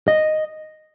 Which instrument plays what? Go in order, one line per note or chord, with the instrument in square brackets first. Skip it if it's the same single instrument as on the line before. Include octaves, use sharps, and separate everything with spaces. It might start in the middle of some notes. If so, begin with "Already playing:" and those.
[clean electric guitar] D#5